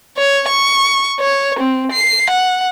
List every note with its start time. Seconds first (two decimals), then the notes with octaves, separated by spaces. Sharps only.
0.18 C#5
0.48 C#6
1.20 C#5
1.59 C4
1.92 C7
2.30 F#5